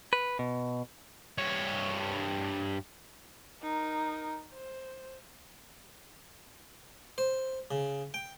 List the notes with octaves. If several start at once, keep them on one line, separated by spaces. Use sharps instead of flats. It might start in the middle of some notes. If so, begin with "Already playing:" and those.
B4
B2
G2 C#5
D#4 A#4
C5
C5
C#3
G5